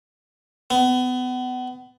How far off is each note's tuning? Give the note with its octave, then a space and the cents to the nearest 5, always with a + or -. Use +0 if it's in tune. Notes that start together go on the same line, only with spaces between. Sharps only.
B3 +30